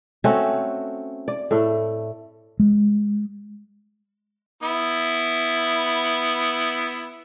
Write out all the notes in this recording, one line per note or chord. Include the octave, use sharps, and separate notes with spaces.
A3 C4 C#4 F#4
D5
A2 A3
G#3
B3 E4